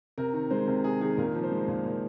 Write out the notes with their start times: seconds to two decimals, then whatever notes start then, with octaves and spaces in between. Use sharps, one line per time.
0.18 C3 A#4
0.34 D#3
0.50 G#3 C5
0.67 C3 A#4
0.84 C3 G#4
1.01 D#3 G#4
1.18 A#2 A#4
1.35 F3
1.43 C5
1.52 G#3
1.68 A#2
1.85 A#2